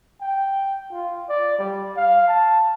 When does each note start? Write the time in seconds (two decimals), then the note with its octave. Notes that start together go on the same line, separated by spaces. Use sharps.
0.21 G5
0.92 F4
1.29 D5
1.59 G3
1.97 F5
2.28 A5